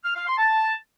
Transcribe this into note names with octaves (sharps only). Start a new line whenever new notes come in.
F6
F5
C6
A5